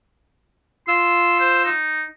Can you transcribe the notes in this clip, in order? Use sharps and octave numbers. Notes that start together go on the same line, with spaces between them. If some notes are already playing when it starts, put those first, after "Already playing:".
F4 C6 E6
C5
D#4